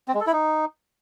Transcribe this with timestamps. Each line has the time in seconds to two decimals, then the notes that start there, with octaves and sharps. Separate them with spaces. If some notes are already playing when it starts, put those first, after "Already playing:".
0.08 C4
0.14 G#3
0.21 A4
0.27 E4
0.33 D#4